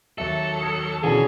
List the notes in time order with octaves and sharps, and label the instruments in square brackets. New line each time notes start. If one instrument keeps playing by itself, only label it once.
[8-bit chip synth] D#2 F#3 C#7 [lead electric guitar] A4 [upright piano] E5
[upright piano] D#6 G#6
[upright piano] B2 D3 [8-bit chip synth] E3 C#4 [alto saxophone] G#4